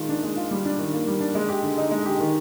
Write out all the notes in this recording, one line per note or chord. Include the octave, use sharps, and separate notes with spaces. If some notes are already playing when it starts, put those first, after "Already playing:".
Already playing: D#3 G#3 F4
D4
G#3
F4
G3
D4
D#3
A#3
G3
D4
G#3
G4
D3
D#4
G#3
G4
D#3